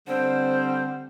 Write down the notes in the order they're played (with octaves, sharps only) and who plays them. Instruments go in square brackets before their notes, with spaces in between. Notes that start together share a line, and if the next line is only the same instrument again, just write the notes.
[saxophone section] D3 G3 C4 [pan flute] C5